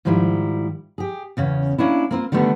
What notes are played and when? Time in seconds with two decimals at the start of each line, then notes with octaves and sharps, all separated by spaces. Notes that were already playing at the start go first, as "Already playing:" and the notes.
0.05 G#2 D#3 F3 G3 E4
0.98 G4 G#4
1.37 E2 C#3 C#4
1.78 A#3 C#4 D4 E4
2.11 A#3 C4 F4
2.32 D3 D#3 G3 A3 B3